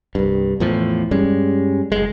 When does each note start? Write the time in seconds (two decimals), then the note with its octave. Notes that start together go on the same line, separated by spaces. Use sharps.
0.15 C2 G2
0.60 E2 A2 F3
1.11 G2 G3 G#3 C#4
1.92 F#1 C2 G#3